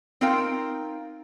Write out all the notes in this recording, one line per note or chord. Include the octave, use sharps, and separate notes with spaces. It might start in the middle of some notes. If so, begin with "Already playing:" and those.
C4 D#4 F4 A#4 F5 G5